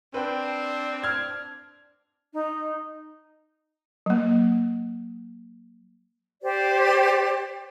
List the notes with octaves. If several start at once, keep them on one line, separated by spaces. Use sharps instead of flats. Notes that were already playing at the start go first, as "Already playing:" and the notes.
C4 D4 B4 G5
F6 G#6
D#4
F#3 A#3
G4 C5 D5